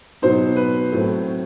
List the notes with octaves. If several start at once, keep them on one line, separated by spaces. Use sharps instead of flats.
B2 F#3 B3 D#4 C5
B4
A2 F#3 A3 C4